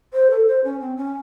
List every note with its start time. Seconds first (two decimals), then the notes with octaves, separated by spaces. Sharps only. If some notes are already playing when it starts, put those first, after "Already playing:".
0.13 C5
0.30 A4
0.47 C5
0.64 C#4
0.81 C4
0.97 C#4